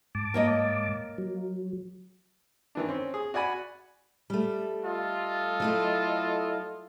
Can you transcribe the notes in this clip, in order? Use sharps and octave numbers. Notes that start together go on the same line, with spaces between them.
G#2 A5 D6
A#3 C#5 D#5
F#3
D#3 E3 D4
C4 C#4
G#4
F#4 D5 F#5 G#5 B5
G3 A3
F4 A4 D#5
F#3 A3 E4